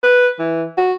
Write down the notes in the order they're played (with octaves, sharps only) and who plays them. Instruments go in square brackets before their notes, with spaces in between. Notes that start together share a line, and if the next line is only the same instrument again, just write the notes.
[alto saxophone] B4
E3
F#4